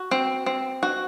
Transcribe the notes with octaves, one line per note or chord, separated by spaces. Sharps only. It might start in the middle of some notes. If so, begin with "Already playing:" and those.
Already playing: F#4
C4
C4
F#4